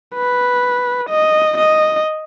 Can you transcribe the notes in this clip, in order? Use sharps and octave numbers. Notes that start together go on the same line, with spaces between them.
B4
D#5
D#5